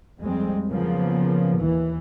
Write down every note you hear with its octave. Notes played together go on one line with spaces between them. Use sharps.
F2 G3 G#3 C4
C#3 F3 F#3 A#3 B3
D#2 E3